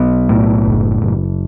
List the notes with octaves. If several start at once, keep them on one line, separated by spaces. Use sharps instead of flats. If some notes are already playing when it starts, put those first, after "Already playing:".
Already playing: B1 B3
A2
F#1
F#1